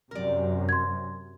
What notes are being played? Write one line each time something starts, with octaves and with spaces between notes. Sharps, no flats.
F#2 C3 A#4 D5
C6 G#6